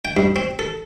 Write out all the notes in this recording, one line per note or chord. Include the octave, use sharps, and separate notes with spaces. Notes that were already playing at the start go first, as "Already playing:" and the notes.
G5
G2
C4
A4